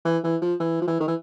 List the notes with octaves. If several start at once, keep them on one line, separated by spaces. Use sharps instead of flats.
E3
E3
F3
E3
F3
E3
D#3
E3